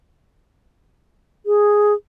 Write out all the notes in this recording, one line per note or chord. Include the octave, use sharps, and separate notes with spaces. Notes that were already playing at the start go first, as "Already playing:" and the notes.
G#4